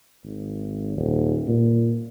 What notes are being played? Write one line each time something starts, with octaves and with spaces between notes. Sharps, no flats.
G#1
D#1
A#2